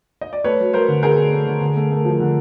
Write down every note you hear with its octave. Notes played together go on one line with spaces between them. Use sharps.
D#5
D5
A3 B4 C#5
F#3
F#3 A#4 C5
D3
D3 G#4 A#4
A3
A3
D3
D3
A3
A3
F3
D3